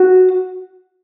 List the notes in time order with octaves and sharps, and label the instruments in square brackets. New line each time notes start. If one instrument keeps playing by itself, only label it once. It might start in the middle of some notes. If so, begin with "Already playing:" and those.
Already playing: [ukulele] F#4